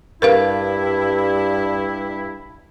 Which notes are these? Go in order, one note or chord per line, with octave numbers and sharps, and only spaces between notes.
G2 E4 A#4 B4 F5